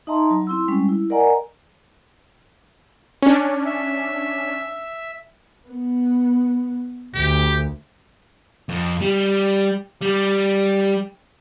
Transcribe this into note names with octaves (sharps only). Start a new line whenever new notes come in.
D#4 D#5 E5 A5 A#5 C6
F#3
C4 E4 C6 E6
G3 G#3 C#4
E4
A#4 D5 D#5 F#5 G#5 A#5
C#4 D4
E5
B3
D2 G4
F2
G3
G3